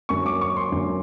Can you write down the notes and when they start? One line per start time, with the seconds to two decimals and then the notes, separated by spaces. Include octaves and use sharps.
0.09 F#2 D3 F#3 A#3 C#6
0.26 D6
0.41 C#6
0.57 C6
0.72 F#2 D3 F#3 A#3